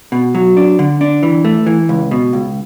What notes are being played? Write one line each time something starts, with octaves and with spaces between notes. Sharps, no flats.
B2
F#3
D4
D3
D4
E3
A3
E3
C#2
B2
C#2